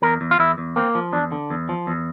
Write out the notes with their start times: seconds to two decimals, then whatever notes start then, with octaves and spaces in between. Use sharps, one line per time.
0.02 E2 A#4
0.21 E2
0.31 F4
0.39 E2 E4
0.58 E2
0.76 A#3 C4
0.95 F3
1.12 E2 D4
1.32 D3
1.50 E2
1.69 F3
1.87 E2